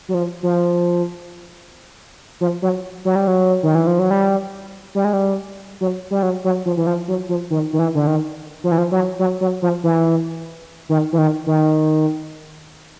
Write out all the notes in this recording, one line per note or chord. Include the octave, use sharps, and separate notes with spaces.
F#3
F3
F3
F3
F#3
F#3
G3
F#3
D#3
E3
F3
F#3
G3
G3
G#3
G3
F#3
G3
F#3
F#3
F3
E3
F3
F#3
F3
D#3
D#3
E3
D3
D#3
F3
E3
F3
F#3
F#3
F#3
F3
E3
D#3
E3
D#3
D#3